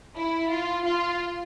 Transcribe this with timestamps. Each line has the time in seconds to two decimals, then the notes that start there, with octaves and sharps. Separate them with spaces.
0.15 E4
0.50 F4
0.84 F4